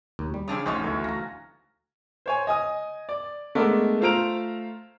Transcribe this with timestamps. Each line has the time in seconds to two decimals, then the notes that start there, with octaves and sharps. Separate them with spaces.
0.19 D#2
0.34 G3
0.48 C#3 F3 C4 D4 C#5 A5 D#6
0.66 A1 F3 C#4 D#4 F#4 C5 D#5
0.84 D2 E3 C#5 A5
1.04 D2 F5 A#5 A#6
2.26 C5 C#5 G#5
2.47 D#5 G#5 D#6
3.09 D5
3.55 G#3 A3 B3 D4 A#4
4.01 A3 F4 C5 A#5 D7 F7